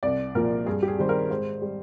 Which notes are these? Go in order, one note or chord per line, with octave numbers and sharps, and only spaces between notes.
C2 D5
A#2 F3 A#4
G2 G#4
G4
G#4
D#3 G3 C5
A#4
G#2 C5
G3